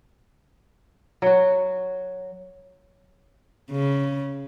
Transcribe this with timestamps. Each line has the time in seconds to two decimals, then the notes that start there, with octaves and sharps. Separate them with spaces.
1.22 F#3 F#4
3.71 C#3